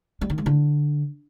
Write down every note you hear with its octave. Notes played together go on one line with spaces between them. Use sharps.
G3
D#3
G#3
D3